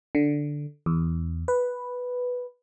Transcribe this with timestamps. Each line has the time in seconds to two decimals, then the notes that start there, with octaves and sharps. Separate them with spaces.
0.15 D3
0.86 E2
1.48 B4